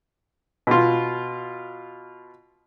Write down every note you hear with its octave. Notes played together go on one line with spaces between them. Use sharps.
B2 F4